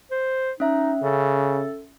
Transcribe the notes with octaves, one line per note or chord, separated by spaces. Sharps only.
C5
C#4 D#4 E5
C#3 A4